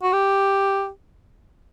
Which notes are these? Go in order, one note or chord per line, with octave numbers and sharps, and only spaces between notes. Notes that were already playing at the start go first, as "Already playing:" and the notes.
F#4
G4